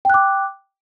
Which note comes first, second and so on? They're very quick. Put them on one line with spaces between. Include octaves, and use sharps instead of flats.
G5 F#6 D6